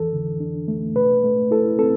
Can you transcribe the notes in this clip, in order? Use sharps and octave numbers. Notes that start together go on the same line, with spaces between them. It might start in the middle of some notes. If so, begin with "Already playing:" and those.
Already playing: F2 E3 A4
D3
D4
A3
B2 B4
A3
E4 A4
C4 A4